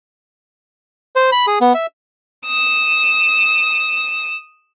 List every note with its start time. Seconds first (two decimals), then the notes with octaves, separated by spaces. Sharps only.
1.16 C5
1.32 B5
1.47 G#4
1.61 B3
1.74 E5
2.46 D#6 E7